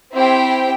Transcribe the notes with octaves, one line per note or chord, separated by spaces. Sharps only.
C4 E4 G4 C5 G5